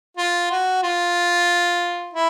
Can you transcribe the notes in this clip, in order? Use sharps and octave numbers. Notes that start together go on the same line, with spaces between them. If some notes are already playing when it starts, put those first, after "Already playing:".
F4
F#4
F4
E4